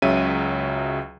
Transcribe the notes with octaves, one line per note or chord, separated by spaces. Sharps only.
C#2 C#3 F#3 E5 D#7